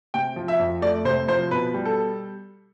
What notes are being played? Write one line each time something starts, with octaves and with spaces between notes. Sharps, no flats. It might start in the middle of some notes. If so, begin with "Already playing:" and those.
C3 G5
F3
E5
F2
A3 D5
C3 C5
F3 C5
B2 B4
G3
A4